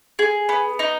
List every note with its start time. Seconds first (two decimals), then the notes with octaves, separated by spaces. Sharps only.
0.19 G#4
0.49 B3
0.79 D#4